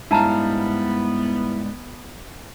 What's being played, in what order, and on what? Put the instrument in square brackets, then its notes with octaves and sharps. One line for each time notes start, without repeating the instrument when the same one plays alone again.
[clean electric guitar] G#2 G3 F5 [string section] B3 [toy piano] D4 A5 A#5 [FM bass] E4